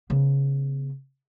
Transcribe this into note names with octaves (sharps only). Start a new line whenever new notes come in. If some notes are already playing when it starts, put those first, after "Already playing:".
C#3 B3